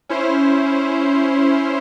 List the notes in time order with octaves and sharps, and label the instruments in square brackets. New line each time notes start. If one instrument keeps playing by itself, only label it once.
[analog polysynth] C#4 E4 C5